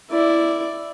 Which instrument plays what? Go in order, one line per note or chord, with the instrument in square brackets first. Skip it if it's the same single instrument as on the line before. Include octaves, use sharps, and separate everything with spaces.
[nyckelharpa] E4 D5